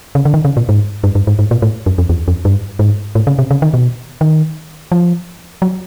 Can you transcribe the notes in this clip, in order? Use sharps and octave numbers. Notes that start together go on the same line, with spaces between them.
C#3
D3
D#3
C#3
A#2
G#2
G2
G2
G#2
G#2
A#2
A2
F#2
F2
E2
F2
G2
G#2
A2
C#3
C3
C#3
D#3
B2
D#3
F3
F#3